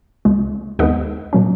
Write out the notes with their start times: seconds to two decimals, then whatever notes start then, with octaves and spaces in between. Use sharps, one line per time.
0.25 C#2 C#3 G#3
0.79 D#2 D#3 G#3 B3 D#5 F#5
1.33 A#2 F#3 C#4